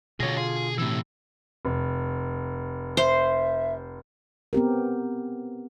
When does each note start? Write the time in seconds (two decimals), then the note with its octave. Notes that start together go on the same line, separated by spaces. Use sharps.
0.20 B2 D3 F4 G#4 C#5 A#6
0.37 F4 G#4
0.78 A2 C3 E3 E6
1.65 F1
2.97 C5 E5
4.53 B3 C4 G4 A#4